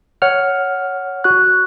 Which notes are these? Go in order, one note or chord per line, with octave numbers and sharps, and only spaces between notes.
C#5 F#5 F6
F#4 F#6